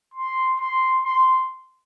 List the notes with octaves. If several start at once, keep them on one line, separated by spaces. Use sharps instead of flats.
C6
C6
C6